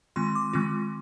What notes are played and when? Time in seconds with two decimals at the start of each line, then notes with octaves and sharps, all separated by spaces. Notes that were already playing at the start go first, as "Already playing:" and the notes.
0.16 D#3 G#3 C4 F4 C6
0.35 D6
0.53 D#3 G#3 C4 F4